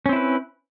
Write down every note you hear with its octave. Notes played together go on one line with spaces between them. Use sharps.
C4 C#4 E4 B4